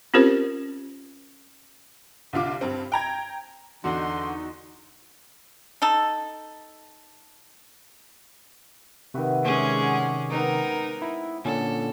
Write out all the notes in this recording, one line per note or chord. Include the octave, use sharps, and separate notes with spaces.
C4 C#4 F4 G4 A#4 C5
C2 D3 F4 D6
G2 C4
G5 A#5 G#6
E2 D3 D#4 F#4 F#5 C6
D#4 A4
C3 D#3 F#4 B4 E5
G#2 G#3 C#4 G#4 D5 E5
F#4
B3 C4 D#4 A#4 G#5
E4
A#2 D3 C#4 A4